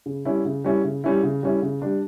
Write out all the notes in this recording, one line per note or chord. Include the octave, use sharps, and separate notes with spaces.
C#3
G3 C#4 E4
C#3
G3 C#4 E4
C#3
G3 C#4 E4
C#3
G3 C#4 E4
C#3
G3 D4